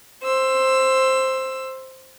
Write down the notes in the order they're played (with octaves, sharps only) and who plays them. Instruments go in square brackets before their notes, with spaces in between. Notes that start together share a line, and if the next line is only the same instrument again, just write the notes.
[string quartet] C5 E6